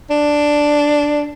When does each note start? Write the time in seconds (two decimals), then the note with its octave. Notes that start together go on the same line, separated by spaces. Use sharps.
0.11 D4